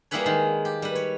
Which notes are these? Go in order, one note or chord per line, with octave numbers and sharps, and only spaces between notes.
G3 A#3 E4 G#4 B4 C#5
D#3 G#3
G4
G3 B4
C#5